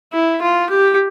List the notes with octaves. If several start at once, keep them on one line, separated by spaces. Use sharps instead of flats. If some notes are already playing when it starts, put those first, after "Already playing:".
E4
F4
G4